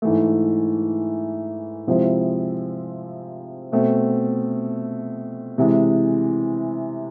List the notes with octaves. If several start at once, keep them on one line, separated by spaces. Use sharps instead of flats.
G#2 E3 A3
C3 F3 G#3 C4 E4
B2 A3 C4
C3 E3 G#3